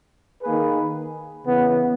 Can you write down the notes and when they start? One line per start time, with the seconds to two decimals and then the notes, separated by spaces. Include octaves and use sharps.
0.42 D#3 A#3 D#4 G#4 B4
1.44 C#3 E3 B3